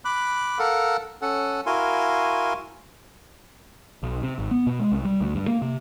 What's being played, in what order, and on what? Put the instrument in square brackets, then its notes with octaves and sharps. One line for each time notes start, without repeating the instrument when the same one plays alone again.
[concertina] B5 D6 F#6
A4 A#4 F5 F#5
C#4 A4 F#5
E4 F#4 A#4 F5 G#5 C6
[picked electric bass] B1
C3
G#1
B3
B2
G#3
C2
G3
D2
G2
A#3
C3